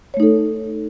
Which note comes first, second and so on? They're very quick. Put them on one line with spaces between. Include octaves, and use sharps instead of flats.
C#5 A3 D#4 A4